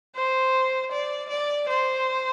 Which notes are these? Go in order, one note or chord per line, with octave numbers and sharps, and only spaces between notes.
C5
D5
D5
C5